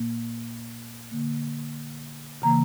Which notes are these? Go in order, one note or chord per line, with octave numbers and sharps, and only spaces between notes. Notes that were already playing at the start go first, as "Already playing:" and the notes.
Already playing: A#2 A#3
D3 A#3
C#3 E3 A#3 A#5